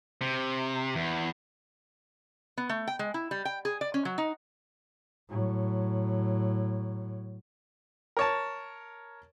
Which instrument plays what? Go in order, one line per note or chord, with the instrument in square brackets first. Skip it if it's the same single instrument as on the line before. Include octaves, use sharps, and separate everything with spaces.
[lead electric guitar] C3
E2
[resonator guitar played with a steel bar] B3
A3
G5
G#3
E4
G3
G5
G#4
D5
C#4
F#3
D#4
[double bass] A2 F#3
[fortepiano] A#4 C#5 A5